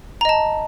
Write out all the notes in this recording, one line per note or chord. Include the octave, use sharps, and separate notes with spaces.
D#5 A5 A#5